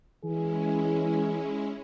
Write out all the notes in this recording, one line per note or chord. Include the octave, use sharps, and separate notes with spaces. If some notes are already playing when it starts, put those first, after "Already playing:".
E3 G#3 C#4 E4 G#4